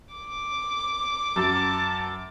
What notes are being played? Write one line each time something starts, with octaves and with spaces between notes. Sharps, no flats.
D6
F#2 A5